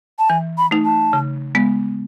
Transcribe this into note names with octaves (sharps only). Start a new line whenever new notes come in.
A5
E3 G#5
B5
A3 D#4
A5
C#3
G#3 B3